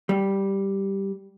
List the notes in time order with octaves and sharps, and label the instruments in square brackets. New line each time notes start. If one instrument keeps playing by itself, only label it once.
[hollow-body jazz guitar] G3